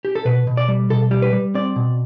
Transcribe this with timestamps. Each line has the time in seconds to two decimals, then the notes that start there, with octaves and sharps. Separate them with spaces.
0.05 G4
0.15 A4
0.25 B2 B4
0.47 B2
0.57 D5
0.68 G3
0.90 B2 A4
1.11 G3
1.22 B4
1.33 G3
1.55 C4 D5
1.76 B2